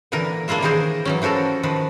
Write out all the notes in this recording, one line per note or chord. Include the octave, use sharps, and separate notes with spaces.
A#2 D3 E3 A#4
A#3 D4 E4 F4 E5
D#3 E3 G#4 A#4 C5
E3 F#3 C#4
E3 F3 F#4 A4 A#4
D#3 F3 B4